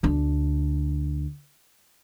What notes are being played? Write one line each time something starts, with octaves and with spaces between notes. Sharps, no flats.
D2 D4